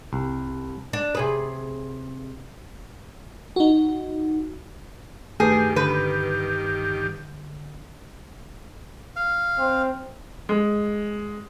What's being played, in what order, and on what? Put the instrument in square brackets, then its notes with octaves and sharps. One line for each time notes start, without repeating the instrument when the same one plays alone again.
[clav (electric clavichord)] C2
[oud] D4
C3 G#4 B4
[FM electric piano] D#4 F#4
[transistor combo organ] G2 D#3 G4 [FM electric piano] A3 B4 [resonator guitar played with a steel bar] G#4
[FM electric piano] D3 [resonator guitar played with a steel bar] B4
[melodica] F5
[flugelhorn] C4
[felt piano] G#3